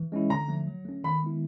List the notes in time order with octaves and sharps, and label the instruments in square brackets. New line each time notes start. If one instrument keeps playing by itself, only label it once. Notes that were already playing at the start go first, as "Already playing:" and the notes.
Already playing: [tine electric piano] E3
G#3 C#4 E4
[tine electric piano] D3 [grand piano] A#5
[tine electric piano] F3 A3
F#3
A3 C#4
[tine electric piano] D#3 [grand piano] B5
[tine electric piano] G#3 B3 E4